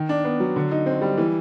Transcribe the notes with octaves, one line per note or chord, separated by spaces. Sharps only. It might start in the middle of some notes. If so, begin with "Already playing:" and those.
Already playing: D#3
D4
B3
F#3
D3
D#4
C4
G3
E3